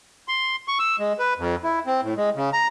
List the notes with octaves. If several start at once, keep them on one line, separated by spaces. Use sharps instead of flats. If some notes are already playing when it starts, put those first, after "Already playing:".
C6
C#6
E6
G#3
B4
F2
E4
C4
A2
G#3
C#3
A#5